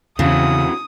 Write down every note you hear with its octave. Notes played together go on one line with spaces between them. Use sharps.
E2 C#3 C4 E4 F#4 D#6